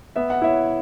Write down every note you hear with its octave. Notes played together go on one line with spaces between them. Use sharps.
B3 E5
F#5
E4 C#5 E5